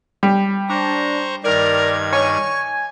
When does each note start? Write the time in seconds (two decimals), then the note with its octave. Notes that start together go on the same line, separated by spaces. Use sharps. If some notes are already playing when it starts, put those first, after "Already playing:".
0.23 G3
0.69 D4 C5 A#5 C#6
1.44 G2 D#3 A#4 D5 G#6
2.13 C#5 G#5 C#6